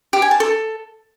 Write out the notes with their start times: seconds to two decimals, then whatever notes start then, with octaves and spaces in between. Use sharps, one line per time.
0.13 G4
0.22 G#5
0.31 A5
0.40 A4